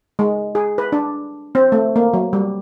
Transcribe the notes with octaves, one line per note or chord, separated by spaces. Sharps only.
G#3
G#4
B4
D4
C4
A3
A#3
F#3
G3